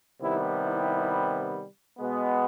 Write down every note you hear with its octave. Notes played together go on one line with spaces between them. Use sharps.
C3 D#3 G3 B3 E4
E4
B2 G#3 B3